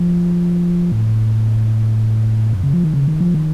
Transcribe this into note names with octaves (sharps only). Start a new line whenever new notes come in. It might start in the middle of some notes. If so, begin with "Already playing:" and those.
Already playing: F3
A2
F#2
C#3
F3
D#3
C#3
D#3
F3
D#3